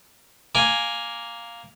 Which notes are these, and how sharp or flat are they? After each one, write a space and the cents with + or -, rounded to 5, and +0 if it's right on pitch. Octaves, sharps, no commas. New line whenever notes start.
A#3 +0 G#5 +0